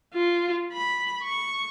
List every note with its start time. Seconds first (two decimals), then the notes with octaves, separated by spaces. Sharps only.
0.13 F4
0.72 B5
1.23 C#6